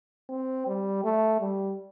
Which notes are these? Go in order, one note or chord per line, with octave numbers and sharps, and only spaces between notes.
C4
G3
A3
G3